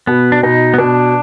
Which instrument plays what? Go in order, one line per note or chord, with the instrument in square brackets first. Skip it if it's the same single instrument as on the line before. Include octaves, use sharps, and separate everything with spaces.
[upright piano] B2 [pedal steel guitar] B3
[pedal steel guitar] D4
[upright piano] B2 [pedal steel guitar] D#4
[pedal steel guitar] B3
[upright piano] B2 [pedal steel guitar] D4